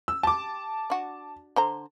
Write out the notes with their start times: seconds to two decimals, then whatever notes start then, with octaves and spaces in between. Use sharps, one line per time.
0.08 E6
0.23 G4 A5 D6
0.90 D4 F#4
1.56 D3 C5 A#5